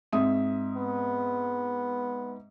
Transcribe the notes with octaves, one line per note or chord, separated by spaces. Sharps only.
G#2 C4 E5 D#6
B3